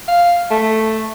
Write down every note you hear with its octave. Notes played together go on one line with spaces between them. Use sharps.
F5
A3